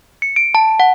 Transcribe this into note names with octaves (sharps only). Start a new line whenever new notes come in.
C#7
D7
A5
F#5